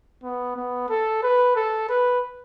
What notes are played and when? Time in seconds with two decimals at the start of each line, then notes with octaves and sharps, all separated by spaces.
0.23 B3
0.56 B3
0.89 A4
1.23 B4
1.56 A4
1.89 B4